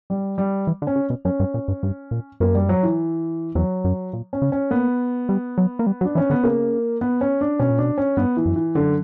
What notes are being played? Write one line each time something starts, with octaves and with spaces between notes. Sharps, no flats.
G3
G3
E3
D3
C#4
C#3
B2
F#2 C#4
G2
A#2
G2
G2
A#2
F#2 A#3
G3
F#3
E3
E2 F#3
F#2
A#2
C#4
C#3
C#4
A#3 B3
G3
F#3
A#3
G3
F#3
D4
E3 C#4
D3 B3
C#3 A#3
B3
C#4
D4
B2 C#4
A#2
B2 D4
C#4
G2 B3
E3
F#2
E3
F#2 D3